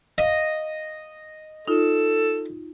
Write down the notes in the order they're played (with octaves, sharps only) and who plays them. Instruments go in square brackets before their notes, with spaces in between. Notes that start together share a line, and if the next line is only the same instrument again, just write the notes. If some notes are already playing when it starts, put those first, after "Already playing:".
[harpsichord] D#5 [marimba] F5
[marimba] D#4 F4 [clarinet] A4